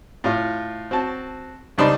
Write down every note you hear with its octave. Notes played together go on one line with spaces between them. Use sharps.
A2 F4
C4 F#4 A5
C#2 G3 D4 D#4 C5 B5